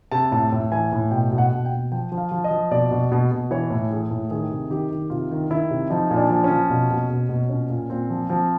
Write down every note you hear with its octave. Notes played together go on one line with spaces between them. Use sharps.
C3 A5
A2 A5
A2
E3 G#5
A2
B2 G5
B2
F#5
B2
G5
B2
F3 G5
F3
F5
F3
D#5
F3
B2 D5
B2
B2
B2
E3 C#5
A2
E3 G#4
A2
D#3 G#4
C3
D#3 G4
D#3
C3 F4
D#3
D#3 E4
C3
F3 D#4
A#2
D4
F3
C#4
F3
B2
B2
B2
B2
A#2 C#4
A#2
A#2 C4
F3
F3 C4